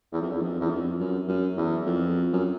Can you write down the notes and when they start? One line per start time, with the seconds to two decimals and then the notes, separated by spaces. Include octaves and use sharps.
0.12 E2
0.22 F2
0.31 E2
0.42 F2
0.60 E2
0.70 F2
0.99 F#2
1.28 F#2
1.57 E2
1.86 F2
2.33 F#2